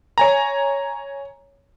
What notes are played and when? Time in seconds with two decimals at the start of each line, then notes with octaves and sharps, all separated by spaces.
0.18 C#5 G#5 A#5